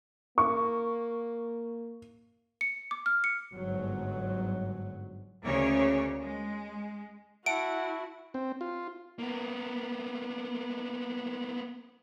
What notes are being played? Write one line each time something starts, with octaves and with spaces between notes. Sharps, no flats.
A#3 C#6
C#7
D6
F6
C#7
G1 G#2 F#3
D2 C#3 A#3 C#5
G#3
E4 F#4 E5 F#5 A5 D7
C4
F4
A#3 B3